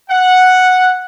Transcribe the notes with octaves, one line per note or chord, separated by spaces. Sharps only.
F#5